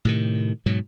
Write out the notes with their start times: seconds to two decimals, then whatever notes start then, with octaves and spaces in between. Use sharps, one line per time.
0.05 A2 C3 D#3
0.66 G#2 B2 F#3